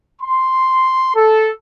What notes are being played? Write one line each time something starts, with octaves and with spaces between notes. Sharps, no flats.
C6
A4